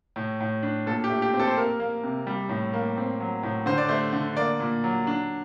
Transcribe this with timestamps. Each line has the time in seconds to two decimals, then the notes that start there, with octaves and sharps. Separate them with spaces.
0.16 A2
0.40 A2
0.63 D4
0.86 A#2 A4
1.04 G4
1.10 A3
1.22 G4
1.34 C4
1.40 A4
1.48 C5
1.57 A#3 A#4
1.80 A#3
2.03 C3
2.27 G3
2.49 A2
2.73 A#3
2.97 C4
3.20 F#3
3.43 A2
3.66 D3 C5
3.78 D5
3.89 A3 C5
4.13 D3
4.36 A#3 D5
4.60 A#2
4.84 F#3
5.07 D4